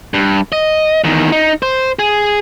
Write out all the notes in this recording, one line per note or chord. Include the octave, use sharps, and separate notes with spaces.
G2
D#5
E2 D#3
D#4
C5
G#4